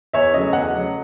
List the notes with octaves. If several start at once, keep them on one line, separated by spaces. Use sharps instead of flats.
E2 C#5 E5
C#3 F#3 A3 D#5
E2 D#5 F#5
C#3 F#3 A3